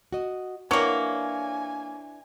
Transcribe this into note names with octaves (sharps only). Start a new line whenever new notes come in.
F#4 D#5
F#3 A#3 D4 E4 B4 C#5 G#5 D6